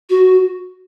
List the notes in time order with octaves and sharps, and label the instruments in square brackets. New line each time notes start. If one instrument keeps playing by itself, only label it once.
[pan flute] F#4